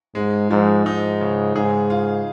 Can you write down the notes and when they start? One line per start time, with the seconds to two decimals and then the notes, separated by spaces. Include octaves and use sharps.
0.15 G#2 G#3
0.50 G#2 F3
0.86 G#2 D#4
1.21 C#3
1.56 G#2 G#4
1.90 F4